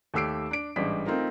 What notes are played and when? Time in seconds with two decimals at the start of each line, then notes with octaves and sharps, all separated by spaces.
0.14 D#2 A3 G4 E6 C7 D7
0.51 D4 D7
0.76 A1 G#2 G3 D4 D#5 B6
1.06 A3 C4 D#4 F4 A#4